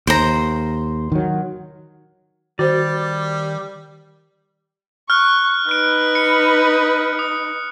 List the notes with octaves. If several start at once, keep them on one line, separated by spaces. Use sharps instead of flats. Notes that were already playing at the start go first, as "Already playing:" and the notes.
D#2 C5 A#5
D#3 F#3
D#3 G3 F#4 C5 D5
C#6 F6 F#6
D#4 B4 F#6 D7
C#7
D#6